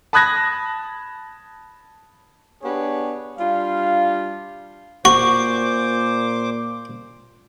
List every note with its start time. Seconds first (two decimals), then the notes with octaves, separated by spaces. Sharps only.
0.13 A5 B5 D#6 F#6 G#6 A#6
2.63 B3 D4 G4 G#4 C#5
3.38 G3 D4 F4 F5
5.05 A#2 F#4 C5 C#6 D6